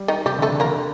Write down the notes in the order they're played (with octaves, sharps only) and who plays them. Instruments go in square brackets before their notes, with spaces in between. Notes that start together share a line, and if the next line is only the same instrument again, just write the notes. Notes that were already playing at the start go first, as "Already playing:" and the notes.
Already playing: [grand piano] G3
[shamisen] D#3 D#4
[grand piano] C3 [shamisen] G3 G4
[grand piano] D3 [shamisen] A3 A4
[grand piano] D3
[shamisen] A#3 A#4
[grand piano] D3